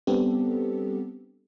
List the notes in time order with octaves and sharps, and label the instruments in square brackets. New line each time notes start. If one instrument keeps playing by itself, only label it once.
[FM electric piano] G3 B3 C4 D4 G4 A4